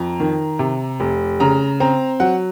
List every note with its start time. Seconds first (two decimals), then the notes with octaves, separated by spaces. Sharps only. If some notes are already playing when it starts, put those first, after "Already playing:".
Already playing: F2 A#5
0.20 D#3
0.59 C3
1.00 F1
1.40 C#3 A#5
1.80 C4 A#5
2.20 F#3 F#5